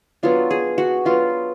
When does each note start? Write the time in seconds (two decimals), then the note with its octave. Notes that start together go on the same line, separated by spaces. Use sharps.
0.23 F#3 B3 D4 F4
0.51 G#4
0.78 F#4
1.05 F#3 B3 D4 F4